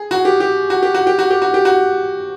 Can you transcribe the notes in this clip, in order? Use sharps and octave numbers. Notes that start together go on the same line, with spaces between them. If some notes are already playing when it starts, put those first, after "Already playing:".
Already playing: G#4
F#4
G4
G4
F#4
G4
F#4
G4
F#4
G4
F#4
G4
F#4